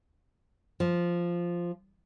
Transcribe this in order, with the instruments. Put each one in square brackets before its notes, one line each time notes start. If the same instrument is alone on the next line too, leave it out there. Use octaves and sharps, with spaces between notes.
[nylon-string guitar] F3